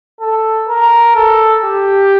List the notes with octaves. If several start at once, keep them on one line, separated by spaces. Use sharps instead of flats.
A4
A#4
A4
G4